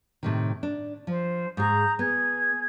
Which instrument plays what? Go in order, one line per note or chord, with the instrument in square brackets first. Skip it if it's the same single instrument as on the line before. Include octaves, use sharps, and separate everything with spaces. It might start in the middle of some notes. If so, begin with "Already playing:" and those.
[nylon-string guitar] A2 C3 D#3
D4
[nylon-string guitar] F3 [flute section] C5
[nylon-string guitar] G#2 G#4 [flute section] A#5 D#6 G6
[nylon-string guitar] B3 [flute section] G#4 G#6